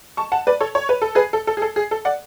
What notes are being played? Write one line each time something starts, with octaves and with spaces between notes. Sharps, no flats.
A5 C#6
F#5 A5
B4 D5
A4 C#5
C#5
B4
A4
G#4 B4
A4
A4
G#4
A4
G#4
A4
D5 F#5